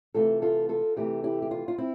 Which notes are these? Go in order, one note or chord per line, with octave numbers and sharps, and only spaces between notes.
C3 E3 A3 F4 A4
F4 A4
F4 A4
C3 E3 A3 E4 G4
E4 G4
G4
F4
F4
C4 E4